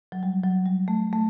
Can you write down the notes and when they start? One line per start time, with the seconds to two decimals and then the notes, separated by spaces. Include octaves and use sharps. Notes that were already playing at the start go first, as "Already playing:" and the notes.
0.12 F#3
0.23 G3
0.44 F#3
0.66 G3
0.88 A3
1.13 A3